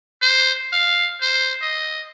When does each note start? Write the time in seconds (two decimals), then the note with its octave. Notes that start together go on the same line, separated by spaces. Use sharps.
0.22 C5
0.73 F5
1.21 C5
1.62 D#5